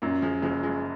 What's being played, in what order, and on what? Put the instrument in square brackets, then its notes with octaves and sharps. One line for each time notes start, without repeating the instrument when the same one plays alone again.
[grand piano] F#2 [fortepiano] A#2
[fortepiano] F3 G#3
[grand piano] F#1 [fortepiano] F3 G#3
[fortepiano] F3 G#3